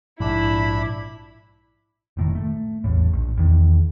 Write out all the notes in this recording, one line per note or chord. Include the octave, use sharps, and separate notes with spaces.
A#1 G#2 D4 E4 B5
F1 A2 D#3
A3
A1 E2 A2
A#1
E2 D#3